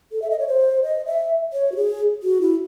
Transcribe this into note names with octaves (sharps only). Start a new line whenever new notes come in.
A4
E5
D#5
C#5
C5
D#5
E5
C#5
F#4
G#4
F#4
E4